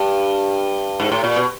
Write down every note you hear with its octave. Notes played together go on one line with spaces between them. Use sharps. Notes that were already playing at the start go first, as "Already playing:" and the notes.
Already playing: G2
G#2
A2
A#2
B2